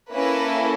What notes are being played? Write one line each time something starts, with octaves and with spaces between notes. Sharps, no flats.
A#3 C#4 E4 A4 B4